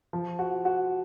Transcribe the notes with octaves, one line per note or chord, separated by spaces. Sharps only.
F3
F#4
F#4